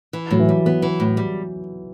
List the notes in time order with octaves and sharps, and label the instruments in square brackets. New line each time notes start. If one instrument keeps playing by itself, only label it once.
[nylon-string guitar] E3
[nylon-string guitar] A2 [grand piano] F#3
[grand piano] E3
[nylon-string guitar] G3
[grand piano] F#3 [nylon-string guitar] B3
[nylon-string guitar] E3
A2
G3